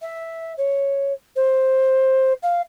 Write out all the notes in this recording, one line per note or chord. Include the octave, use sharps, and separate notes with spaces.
E5
C#5
C5
F5